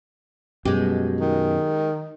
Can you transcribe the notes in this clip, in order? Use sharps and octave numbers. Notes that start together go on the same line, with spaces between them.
F#2 B2 G#3 G4
D#3